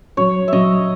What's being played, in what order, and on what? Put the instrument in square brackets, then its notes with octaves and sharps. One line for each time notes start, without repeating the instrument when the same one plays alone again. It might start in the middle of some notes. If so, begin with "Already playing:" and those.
[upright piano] F#3 [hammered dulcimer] C#5
[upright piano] F#3 [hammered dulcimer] D#5 E5